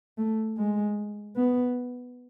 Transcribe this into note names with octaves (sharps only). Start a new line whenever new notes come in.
A3
G#3
B3